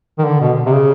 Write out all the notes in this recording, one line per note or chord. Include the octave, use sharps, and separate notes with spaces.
D#3
D3
B2
C3
C#3